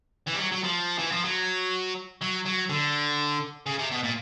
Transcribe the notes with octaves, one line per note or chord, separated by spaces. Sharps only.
E3
G3
F#3
F#3
F3
E3
F3
F#3
F#3
F#3
D3
C#3
C3
B2
A#2